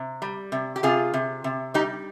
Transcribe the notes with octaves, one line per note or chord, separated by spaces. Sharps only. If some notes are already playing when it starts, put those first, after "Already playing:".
Already playing: C3
G3
C3
G4
C3 F4 G#4
C3
C3
G3 D#4 G4